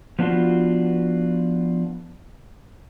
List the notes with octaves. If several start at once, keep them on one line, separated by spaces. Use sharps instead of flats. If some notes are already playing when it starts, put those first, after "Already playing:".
F3 B3 D4 F4 F#4